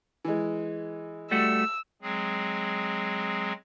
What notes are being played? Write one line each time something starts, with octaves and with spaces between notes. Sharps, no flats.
E3 G#3
G3 A3 F#4 E6
F#3 G#3 C4 G#4